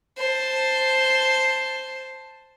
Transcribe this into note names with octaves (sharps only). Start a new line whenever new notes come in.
C5 A5